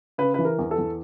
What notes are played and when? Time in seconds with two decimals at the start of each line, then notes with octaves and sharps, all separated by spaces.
0.18 C#3 B4
0.34 E3 B4
0.45 A#4
0.59 E2
0.71 A4
0.78 E2